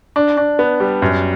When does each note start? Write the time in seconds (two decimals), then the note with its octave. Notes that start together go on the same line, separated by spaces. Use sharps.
0.16 D4
0.37 D4
0.59 B3
0.80 G3
1.02 F#2